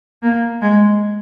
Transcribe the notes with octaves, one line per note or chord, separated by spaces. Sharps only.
A#3
G#3